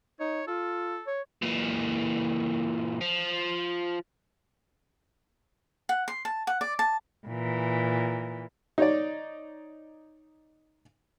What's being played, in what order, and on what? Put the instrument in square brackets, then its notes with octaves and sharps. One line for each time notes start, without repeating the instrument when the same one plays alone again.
[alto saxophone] D#4 [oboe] C#5
[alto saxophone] F4 [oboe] A4
[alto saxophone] C#5
[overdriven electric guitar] A#2 E3
F3
[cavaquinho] F#5
C6
A5
F#5
D5
A5
[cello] A#2 E3
[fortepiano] D#4 C#5 D5